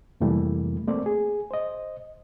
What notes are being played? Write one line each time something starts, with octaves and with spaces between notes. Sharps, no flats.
F2 C3 E3 G3 A3 A#3
A3 A#3 C4 C5 D5
G#4
C5 D#5